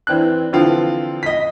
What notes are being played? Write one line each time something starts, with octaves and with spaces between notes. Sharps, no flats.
E3 C4 D4 F#6
D3 E3 F3 C4 F4
D#5 B6